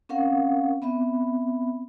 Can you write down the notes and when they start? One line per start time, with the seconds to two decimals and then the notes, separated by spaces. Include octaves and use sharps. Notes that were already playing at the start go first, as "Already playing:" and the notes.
0.09 C4 C#4 A#4 F5 F#5
0.82 B3 C4 E5 B5